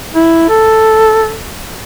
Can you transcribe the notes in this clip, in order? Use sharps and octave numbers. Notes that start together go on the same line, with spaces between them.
E4
A4